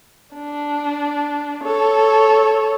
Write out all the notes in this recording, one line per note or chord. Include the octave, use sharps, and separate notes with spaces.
D4
A4 C#5